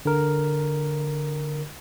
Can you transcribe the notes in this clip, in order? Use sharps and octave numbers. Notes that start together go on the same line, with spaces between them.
D3 A#4